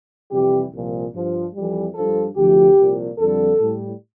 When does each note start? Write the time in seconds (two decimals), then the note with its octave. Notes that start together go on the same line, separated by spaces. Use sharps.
0.31 F2 C3 E3 G3 G4
0.72 C2 A#2 F3
1.13 G2 F3
1.54 F2 E3 G3
1.95 G2 F3 A4
2.36 D2 C3 F3 G4
2.77 C2 A#2 F3
3.18 F2 D3 G3 A4
3.59 A2 G3